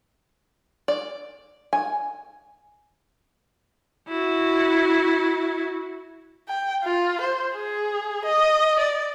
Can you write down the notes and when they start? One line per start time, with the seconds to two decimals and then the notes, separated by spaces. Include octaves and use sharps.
0.88 D5
1.73 G#5
4.08 E4 F#4
6.49 G5
6.84 F4
7.21 C5
7.55 G#4
8.25 D#5
8.79 D5